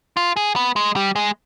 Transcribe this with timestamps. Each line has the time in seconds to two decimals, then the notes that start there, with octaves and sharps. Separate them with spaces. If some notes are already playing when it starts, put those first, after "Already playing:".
0.17 F4
0.37 G#4
0.56 B3
0.76 G#3
0.96 G3
1.16 G#3